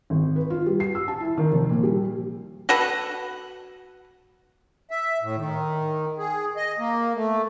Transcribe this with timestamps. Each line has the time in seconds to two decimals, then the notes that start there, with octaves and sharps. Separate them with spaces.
0.10 G#1
0.36 B4
0.50 F4
0.67 G3
0.80 C7
0.95 E6
1.08 A5
1.20 E4
1.38 D#3
1.52 F1
1.69 A#2
1.83 G3
2.69 F#4 A4 B4 F#5
4.91 E5
5.22 A2
5.36 D#3
6.18 G#4
6.57 D#5
6.79 A#3
7.15 A3